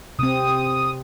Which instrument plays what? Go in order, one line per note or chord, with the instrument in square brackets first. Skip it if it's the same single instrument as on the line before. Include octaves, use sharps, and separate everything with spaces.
[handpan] C3 C4 [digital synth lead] D#6